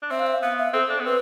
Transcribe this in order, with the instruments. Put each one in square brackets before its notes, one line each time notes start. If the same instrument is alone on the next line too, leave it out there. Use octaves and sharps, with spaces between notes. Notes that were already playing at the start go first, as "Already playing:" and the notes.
[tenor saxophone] D4
[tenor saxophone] C4 [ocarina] E5
[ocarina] F5
E5
[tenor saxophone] B3 [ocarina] F5
[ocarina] E5
[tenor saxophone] C4 [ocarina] A4
[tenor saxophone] D4
B3
[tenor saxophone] C4 [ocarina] B4